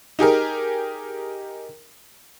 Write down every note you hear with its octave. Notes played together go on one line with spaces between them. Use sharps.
D#4 G4 G#4 A#4